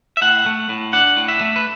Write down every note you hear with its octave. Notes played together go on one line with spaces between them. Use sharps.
E5
A2 F#5
A3
A2
D4 F#5
A2
E5
A3
B4